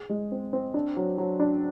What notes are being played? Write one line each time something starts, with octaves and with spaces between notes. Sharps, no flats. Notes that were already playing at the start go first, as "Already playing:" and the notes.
Already playing: G#4
G#3
C4
C4
D4
F#3
F#3
D4